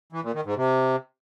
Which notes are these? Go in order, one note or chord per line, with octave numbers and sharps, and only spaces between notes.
E3
A#2
D#3
G#2
C3